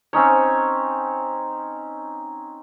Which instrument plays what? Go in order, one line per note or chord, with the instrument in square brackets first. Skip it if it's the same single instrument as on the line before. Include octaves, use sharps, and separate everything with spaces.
[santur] C4 C#4 D#4 C#5